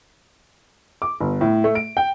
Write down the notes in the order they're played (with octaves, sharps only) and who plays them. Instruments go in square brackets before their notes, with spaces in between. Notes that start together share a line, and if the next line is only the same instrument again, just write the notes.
[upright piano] D6
G1
A2
A3
D7
G5